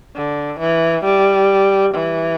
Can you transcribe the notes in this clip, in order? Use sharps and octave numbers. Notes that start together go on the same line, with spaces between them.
D3
E3
G3
E3